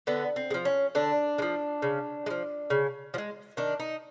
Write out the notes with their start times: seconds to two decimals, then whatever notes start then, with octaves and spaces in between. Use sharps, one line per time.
0.07 D3 B3
0.36 C4
0.51 G#3
0.54 F3
0.65 C#4
0.95 D3 D4
1.38 G#3
1.42 F3
1.82 C#3
2.26 G#3
2.30 F3
2.70 C#3
3.14 F3
3.18 G#3
3.57 D#3 D4
3.80 D#4